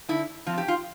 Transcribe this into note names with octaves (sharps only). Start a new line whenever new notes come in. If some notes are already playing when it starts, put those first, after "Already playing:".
D3 E4
F3 C4 F4
G4
F4